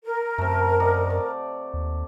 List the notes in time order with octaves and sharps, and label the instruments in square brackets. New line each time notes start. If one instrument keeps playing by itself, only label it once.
[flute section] A#4
[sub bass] F#2 [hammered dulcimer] C3 A3
[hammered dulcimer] D5 D#5 F#5
D5
[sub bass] D#2